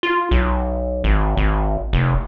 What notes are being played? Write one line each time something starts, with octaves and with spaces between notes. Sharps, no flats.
F4
B1
G#1
G#1
F1